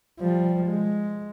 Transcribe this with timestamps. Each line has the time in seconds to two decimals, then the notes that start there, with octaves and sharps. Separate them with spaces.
0.20 F3 G3
0.66 G#3